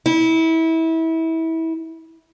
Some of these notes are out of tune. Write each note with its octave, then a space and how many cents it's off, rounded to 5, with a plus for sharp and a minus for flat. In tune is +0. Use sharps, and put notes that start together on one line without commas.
E4 -25